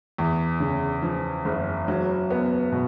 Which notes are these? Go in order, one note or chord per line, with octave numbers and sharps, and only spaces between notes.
E2
C#3
F3
F#1
F#3
B3
B2